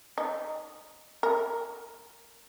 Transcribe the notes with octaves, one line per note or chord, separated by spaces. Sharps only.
D#4
A#4